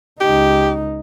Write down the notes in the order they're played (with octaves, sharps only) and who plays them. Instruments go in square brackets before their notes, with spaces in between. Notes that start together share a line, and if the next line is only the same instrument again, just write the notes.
[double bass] C#2 D#4 [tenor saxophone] G4